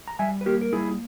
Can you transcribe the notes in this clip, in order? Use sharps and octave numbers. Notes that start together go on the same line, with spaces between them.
A#5
G3 E5 G#5
B4
A#3 G4 A#4
A#4
G3 E4 G#4